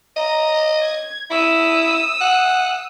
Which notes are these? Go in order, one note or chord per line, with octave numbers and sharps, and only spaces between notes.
D#5 A#5
G#6
E4 D#6 E6
F#5